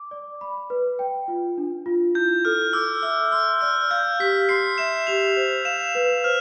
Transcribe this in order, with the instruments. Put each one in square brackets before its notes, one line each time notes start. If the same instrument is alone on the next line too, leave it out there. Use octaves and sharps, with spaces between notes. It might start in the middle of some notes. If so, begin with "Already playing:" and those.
Already playing: [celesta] D6
D5
B5
B4
G5
F4
D4
F4
[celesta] E4 [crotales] G6
[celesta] A4 [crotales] F6
[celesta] D6 [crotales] E6
[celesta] E5 [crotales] E6
[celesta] C6 [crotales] E6
[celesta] D5 [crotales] F6
[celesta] F5 [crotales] G6
[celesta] G4 [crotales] B6
[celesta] C6 [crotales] C7
[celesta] E5 [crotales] E7
[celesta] G4 [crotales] F7
[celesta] C5
[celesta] F5 [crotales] E7
[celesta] B4
[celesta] C5 [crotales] F6